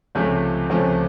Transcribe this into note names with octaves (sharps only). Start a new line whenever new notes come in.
C#2 C3 F3 A3 C#4
C#2 C3 F3 A3 C#4